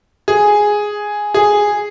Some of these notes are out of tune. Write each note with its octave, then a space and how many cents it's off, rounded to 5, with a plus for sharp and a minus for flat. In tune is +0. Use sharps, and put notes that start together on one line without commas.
G#4 +0
G#4 -5